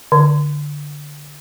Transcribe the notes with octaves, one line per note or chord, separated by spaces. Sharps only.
D3